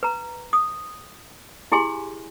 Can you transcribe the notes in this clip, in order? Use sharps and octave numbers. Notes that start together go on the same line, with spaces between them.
B4 A#5
D#6
E4 G4 G#4 G#5 C6